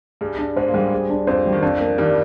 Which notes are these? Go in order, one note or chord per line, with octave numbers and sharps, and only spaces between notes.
G2 G3 G#4
D4
G#2 G#3 C5
A#3
G#2 G3 G#3
G#4
D4
F2 F3 C5
G3
D#3
F2 F3 D4
A#3
G2 D#3 G3